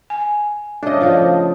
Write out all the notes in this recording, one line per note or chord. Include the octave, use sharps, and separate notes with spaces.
G#5
C#3 A3 D4 D#5
F3 F4 C5 F5